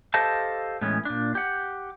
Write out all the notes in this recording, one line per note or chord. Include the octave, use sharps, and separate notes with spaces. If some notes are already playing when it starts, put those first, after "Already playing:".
G4 A4 C5 D#5 F5 A5
A2 E3 G#3 B3 C#4
A#2 D4
G4 F#5